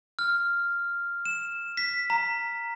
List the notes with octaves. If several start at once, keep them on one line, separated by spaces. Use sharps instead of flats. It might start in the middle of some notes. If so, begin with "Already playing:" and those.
F6
E7
B6
A#5